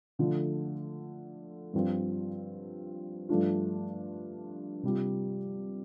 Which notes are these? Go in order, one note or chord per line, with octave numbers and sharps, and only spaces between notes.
D3 F3 A3 F4
G2 F3 C4 F4
G2 F3 A3 D4 F4
C3 G3 F4